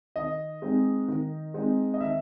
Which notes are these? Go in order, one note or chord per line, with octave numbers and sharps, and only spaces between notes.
D#3 D#5
G#3 C4 D#4
D#3
G#3 C4 D#4
D#5
D#3 E5